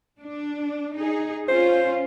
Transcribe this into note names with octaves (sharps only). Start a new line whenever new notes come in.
D4
D#4 G#4
C#4 F4 C5